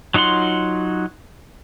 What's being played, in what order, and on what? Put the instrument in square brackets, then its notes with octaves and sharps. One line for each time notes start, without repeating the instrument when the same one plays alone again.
[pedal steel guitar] F#3 D#4 F4 F#5 C6